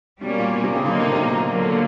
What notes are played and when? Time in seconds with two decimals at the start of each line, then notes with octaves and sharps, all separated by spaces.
0.21 B2 G3 A#3 C#4
0.38 A#2
0.53 B2
0.64 C3
0.75 C#3
0.85 A2 D3 F#3 A#3 D#4
1.01 C3
1.12 C3
1.17 B2
1.33 A#2
1.49 D3 F#3 A#3